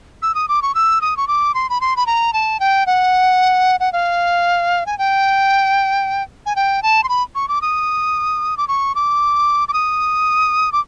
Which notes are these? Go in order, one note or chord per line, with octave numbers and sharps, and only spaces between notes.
E6
D#6
D6
C#6
E6
D#6
C#6
D6
C6
B5
C6
B5
A#5
A5
G5
F#5
F#5
F5
G#5
G5
G#5
G5
A5
C6
B5
C#6
D6
D#6
D6
C#6
D6
D6
D#6
D6